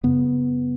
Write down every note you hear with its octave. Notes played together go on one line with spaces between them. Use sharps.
F#2 C#3 B3